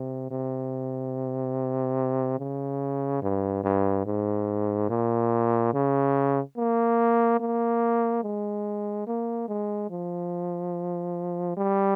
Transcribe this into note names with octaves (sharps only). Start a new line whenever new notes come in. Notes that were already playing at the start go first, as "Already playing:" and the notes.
Already playing: C3
C3
C#3
G2
G2
G#2
A#2
C#3
A#3
A#3
G#3
A#3
G#3
F3
G3